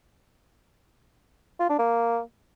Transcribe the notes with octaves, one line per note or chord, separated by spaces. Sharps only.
F4
D4
A#3